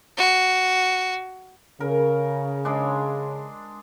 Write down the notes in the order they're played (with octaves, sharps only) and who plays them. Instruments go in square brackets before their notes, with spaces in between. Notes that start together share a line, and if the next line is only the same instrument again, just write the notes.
[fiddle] F#4
[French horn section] C#3 [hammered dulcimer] A#4
[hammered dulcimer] G#3 D4